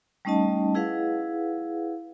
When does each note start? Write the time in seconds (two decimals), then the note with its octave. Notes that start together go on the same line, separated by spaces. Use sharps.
0.25 G3 A3 C#4 D#4 D#5 A5
0.75 E4 G#4 B4 F5 F#5